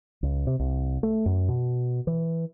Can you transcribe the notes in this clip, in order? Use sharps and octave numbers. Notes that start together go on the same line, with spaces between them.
C#2
C3
C2
A3
F#2
B2
E3